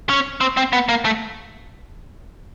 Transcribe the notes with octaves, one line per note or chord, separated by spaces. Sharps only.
C#4
C4
C4
B3
A#3
A3